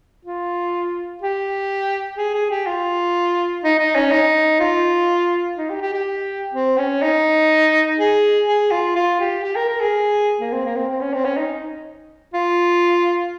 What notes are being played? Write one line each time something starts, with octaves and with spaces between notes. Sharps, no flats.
F4
G4
G#4
G#4
G4
F4
D#4
D#4
C#4
D#4
F4
D#4
G4
G4
G4
C4
C#4
D#4
G#4
G#4
F4
F4
G4
G4
A#4
A#4
G#4
A#3
C4
A#3
C4
C4
C#4
C4
C#4
D#4
F4